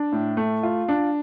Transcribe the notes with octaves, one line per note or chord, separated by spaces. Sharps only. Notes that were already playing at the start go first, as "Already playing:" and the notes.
Already playing: D4
A2
A3
F4
D4